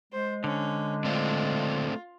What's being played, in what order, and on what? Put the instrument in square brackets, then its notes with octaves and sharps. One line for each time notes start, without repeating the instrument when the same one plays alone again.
[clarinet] G#3 [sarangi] C5
[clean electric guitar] D3 [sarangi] C#4
[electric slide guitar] A3 C4 D4 [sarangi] F4